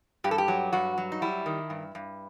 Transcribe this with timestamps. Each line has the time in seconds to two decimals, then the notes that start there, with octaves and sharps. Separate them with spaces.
0.24 G2 G4
0.31 A4
0.38 G4
0.48 F#3
0.73 G2 F#4
0.98 F#3
1.12 D#4
1.22 G3 E4
1.46 D#3
1.70 G2
1.95 G2